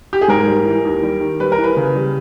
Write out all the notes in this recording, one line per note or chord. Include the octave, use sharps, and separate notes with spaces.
G4
G#4
G#2 A#4
G3
E3
D#2
G3
D#3
G3 B4
A#4
E3
B4
C#3
G3